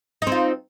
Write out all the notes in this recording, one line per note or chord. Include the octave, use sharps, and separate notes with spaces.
C4 D#4 F4